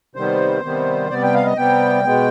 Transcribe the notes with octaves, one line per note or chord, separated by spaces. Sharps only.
C3 D#3 G3 B3 C5
C3 D#3 G3 B3
C3 G3 B3 D5
G5
F5
D#5
C3 G3 B3 G5
B2 G#3 B3